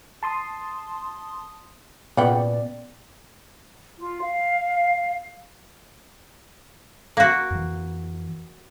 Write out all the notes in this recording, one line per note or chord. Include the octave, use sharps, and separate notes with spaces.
A5 C6 D#6
A#2 C#3 B3 D5 F#5 G5
F4
F5
A#3 F#4
F2 E3